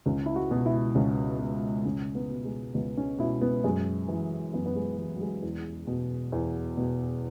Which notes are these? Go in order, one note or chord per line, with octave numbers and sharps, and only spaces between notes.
C#2 C#4
E4
F#4
B2
E4
C#2 C#4
B2
C#2 C#4
B3
B2
G#3
C#2 B3
C#4
B2 E4
B3
F#2 G#3
E3
F#2 B3
B3
G#3
E3 G#3
F#3
G#3
E2
B2
E2
B2